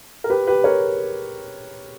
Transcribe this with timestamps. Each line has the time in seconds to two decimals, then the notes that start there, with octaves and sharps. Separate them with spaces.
0.24 A#4
0.30 G4 B4
0.47 G4 B4
0.64 A#4 C#5